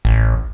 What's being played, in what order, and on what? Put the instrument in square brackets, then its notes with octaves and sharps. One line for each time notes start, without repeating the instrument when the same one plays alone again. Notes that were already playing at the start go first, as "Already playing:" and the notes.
[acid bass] A1